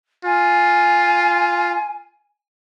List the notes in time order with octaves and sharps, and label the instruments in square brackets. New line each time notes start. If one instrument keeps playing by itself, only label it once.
[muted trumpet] F4 [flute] G#5